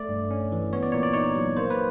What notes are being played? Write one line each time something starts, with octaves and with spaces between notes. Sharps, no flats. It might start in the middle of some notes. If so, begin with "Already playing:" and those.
Already playing: A3 D5
G2
C#4
E3
B3 C#5
D5
A#2 C#5
D5
D#4 C#5
F#3
A#3 C5
B4